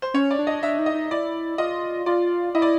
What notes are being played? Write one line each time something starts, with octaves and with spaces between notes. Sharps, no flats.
C5
C#4 C#5
D5
D4
D#5
D4 E5
D#4
D#5
D#4
E4 D5
F4 D#5
F4 D5
E4 D#5
D5